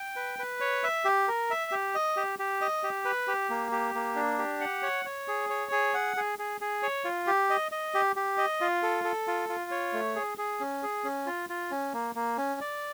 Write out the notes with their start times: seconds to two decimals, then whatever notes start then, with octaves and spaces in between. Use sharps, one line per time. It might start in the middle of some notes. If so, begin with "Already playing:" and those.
Already playing: G5
0.16 B4
0.39 B4
0.60 C#5
0.84 E5
1.05 G4
1.28 A#4
1.50 E5
1.71 G4
1.95 D#5
2.17 G4
2.39 G4
2.61 D#5
2.83 G4
3.05 B4
3.28 G4
3.50 A#3
3.72 G4
3.95 A#3
4.16 D4
4.38 G4
4.61 F#5
4.83 C#5
5.05 C#5
5.28 G#4
5.50 C#5
5.72 G#4
5.94 F#5
6.17 G#4
6.39 G#4
6.61 G#4
6.83 C#5
7.04 F4
7.27 G4
7.50 D#5
7.72 D#5
7.94 G4
8.16 G4
8.38 D#5
8.61 F4
8.83 A4
9.04 A4
9.27 F4
9.49 F4
9.71 C#5
9.93 A3
10.16 G#4
10.38 G#4
10.60 C#4
10.83 G#4
11.04 C#4
11.26 F4
11.50 F4
11.71 C#4
11.93 A#3
12.15 A#3
12.38 C#4
12.61 D5